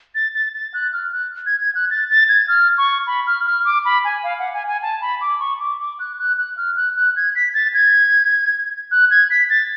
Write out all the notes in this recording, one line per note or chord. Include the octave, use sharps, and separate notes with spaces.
A6
A6
A6
F#6
F6
F#6
G#6
G#6
F#6
A6
A6
G#6
F6
C#6
B5
F6
F6
D6
B5
G#5
F5
F#5
G#5
G#5
A5
B5
D6
C#6
D6
D6
F#6
F#6
F#6
F6
F#6
F#6
G#6
B6
A6
G#6
F#6
G#6
B6
A6